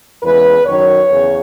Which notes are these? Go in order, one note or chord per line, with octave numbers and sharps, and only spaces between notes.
E2 C#3 E3 G#3 B4
F#2 D#3 F#3 C#5
E2 C#3